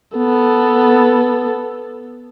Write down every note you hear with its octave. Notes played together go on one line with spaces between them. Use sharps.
B3 A4